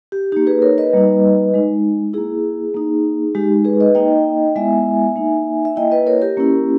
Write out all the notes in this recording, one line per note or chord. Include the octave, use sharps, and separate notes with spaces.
G4
A#3 D#4 G4
G#4 B4
A#4 C#5
B4 D#5
G3 A#3 D#4
G#3 D#4
A#3 E4 G#4
A#3 D#4
G#3 D#4 G4
G#4 B4
B4 D#5
A#3 D#4 D#5 G5
G#3 B3 E4 E5 G#5
A#3 D#4
E5
A#3 E4 D#5 G5
B4 D#5
A#4 C#5
G4 A#4
A#3 C#4 E4